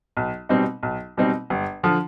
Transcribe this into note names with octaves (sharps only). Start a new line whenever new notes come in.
B1
B2 G3 C4 D#4
B1
B2 G3 C4 D#4
G1
D3 F3